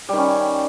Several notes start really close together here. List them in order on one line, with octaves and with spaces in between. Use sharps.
G3 D#3 C#4